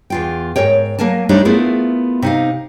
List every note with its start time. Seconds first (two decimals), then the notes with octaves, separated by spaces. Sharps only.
0.10 E2 F4 G5
0.56 G#2 A#4 C#5 G5
0.99 F#3 A#3 A#4 G#5 A5
1.29 G3 A3 D4 D#4 C5 C#5
1.45 A3 B3 E4 F4 G#4 A#4
2.22 C3 D#4 F5